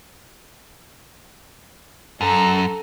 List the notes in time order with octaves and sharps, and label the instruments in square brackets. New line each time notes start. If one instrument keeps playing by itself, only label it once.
[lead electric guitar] F#2 [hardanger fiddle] A4 A#5